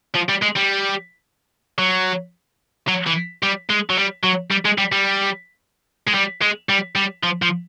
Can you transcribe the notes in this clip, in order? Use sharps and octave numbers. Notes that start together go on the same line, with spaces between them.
F3
G3
G#3
G3
F#3
F#3
E3
G3
G#3
F#3
G3
F#3
G3
G#3
G3
G3
G#3
G3
G#3
G3
G3
F3
F3